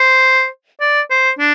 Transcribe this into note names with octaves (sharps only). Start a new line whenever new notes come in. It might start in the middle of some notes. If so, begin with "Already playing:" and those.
Already playing: C5
D5
C5
D4